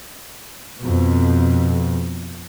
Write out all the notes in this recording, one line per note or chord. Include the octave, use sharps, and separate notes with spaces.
F2 B2